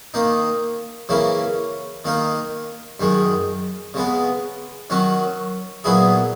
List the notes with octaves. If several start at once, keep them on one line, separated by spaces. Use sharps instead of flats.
D#3 A#3 D#4
C#3 E3 A#3 C#4 E4
D#3 A#3 D#4 A#4
F#2 D#3 G#3
C#3 G#3 B3
D#3 F#3 C#4 F#4
A#2 F#3 B3 E4 G#4